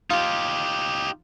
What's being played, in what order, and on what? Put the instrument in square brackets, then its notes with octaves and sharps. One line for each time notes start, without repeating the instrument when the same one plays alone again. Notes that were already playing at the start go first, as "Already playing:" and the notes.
[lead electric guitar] D#4 G4 [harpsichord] F4